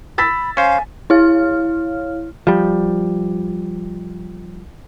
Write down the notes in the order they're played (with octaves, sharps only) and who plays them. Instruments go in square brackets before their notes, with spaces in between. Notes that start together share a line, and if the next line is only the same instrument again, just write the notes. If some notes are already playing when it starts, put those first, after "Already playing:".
[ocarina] B5 [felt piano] E6 A6 B6
[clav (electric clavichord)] C#4 C5 [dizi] F5 [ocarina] G#5
[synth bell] E4 C#5 F5 F6
[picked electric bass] F3 G3